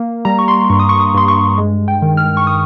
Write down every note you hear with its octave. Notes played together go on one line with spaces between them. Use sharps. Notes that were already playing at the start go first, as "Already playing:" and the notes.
Already playing: A#3
G3 A#5
C#6
C6
G2 C#6
D#6
C#6
D#6
G2 C6
C#6
G#3
G5
D#3
F6
C#6
D#6